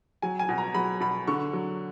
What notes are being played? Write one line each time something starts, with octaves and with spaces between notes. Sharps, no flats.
F#3 G#5
G#5
B2
A#5
F#3 B5
B2 B5
D3 C#6
F#3